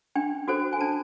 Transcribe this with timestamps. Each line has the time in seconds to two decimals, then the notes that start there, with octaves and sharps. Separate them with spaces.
0.16 D4 G5
0.48 F#4 A4 C5
0.73 G#5
0.81 D4 A5